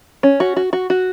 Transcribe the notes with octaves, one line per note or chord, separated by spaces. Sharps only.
C#4
F#4
F#4
F#4
F#4